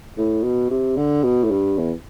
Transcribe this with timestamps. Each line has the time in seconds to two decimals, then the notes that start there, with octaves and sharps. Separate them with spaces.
0.17 A2
0.43 B2
0.71 C3
0.97 D3
1.23 B2
1.44 A2
1.50 G2
1.77 E2